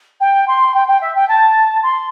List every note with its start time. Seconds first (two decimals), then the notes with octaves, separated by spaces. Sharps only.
0.20 G5
0.47 C6
0.74 G5
0.87 G5
1.01 E5
1.15 G5
1.28 A5
1.83 C6